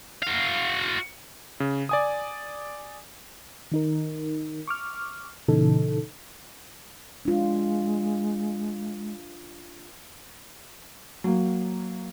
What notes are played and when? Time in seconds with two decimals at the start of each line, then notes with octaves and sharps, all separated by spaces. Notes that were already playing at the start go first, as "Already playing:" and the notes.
0.22 F#4 F5
1.60 C#3
1.89 D5 G#5 D#6
3.72 D#3 D#4 A#4
4.67 C#6 D6 F6
5.48 A#2 C#3 E3 D#4 A4
7.25 G#3 D4 F4
11.24 F#3 A#3